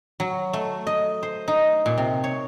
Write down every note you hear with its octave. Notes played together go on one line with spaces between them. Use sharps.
F#3
A3
D#5
C5
D#4
A#2
C3
C#5